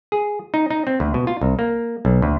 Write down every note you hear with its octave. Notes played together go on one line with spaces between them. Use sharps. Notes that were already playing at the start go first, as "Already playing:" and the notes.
G#4
D#4
D#4
C4
D2
B2
F4
C2
A#3
B1
D2